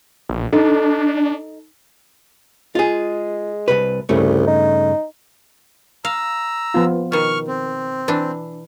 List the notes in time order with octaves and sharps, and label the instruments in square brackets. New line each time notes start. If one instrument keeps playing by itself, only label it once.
[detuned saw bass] A#1
[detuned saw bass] D4 [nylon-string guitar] D#4 A4
[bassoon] G#3 [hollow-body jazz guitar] F4 G#4
[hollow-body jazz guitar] C2 G#2 B4
[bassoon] C2 [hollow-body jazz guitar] G2 C#3 A3
[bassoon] D#4
[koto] F5 [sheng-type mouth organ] A#5 E6
[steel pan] F3 B3 F4
[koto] B2 D#3 [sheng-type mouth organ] C#6 F6
[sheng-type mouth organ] C4
[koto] E3 D4